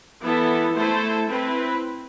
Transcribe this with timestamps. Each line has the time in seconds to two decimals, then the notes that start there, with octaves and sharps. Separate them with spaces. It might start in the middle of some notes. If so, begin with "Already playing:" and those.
0.22 E3 B3 E4 A4
0.75 A3 E4 A4 C5
1.28 C4 E4 B4